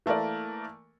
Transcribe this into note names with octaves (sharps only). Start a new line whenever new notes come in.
E3 A3 A#3 A#4 D5